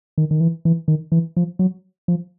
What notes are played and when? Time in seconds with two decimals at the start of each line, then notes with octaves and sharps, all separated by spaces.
0.18 D#3
0.31 D#3
0.40 E3
0.65 E3
0.88 D#3
1.12 E3
1.37 F3
1.59 F#3
2.08 F3